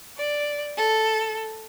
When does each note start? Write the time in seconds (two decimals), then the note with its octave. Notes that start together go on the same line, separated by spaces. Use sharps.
0.17 D5
0.77 A4